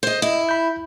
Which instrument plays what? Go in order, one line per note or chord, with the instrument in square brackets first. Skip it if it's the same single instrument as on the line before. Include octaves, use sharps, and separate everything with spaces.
[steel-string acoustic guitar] C5 D#5
[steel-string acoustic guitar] E4 [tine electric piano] D#5
[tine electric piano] B5 G6